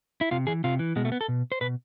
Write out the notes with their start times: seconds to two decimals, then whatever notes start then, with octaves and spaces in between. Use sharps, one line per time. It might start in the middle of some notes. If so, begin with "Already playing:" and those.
0.21 E4
0.31 C3 F4
0.47 E3 G#4
0.64 C3 F4
0.79 E3
0.96 B2 G#3
1.05 A3
1.12 B3
1.21 A4
1.28 B2
1.52 C5
1.61 B2 B4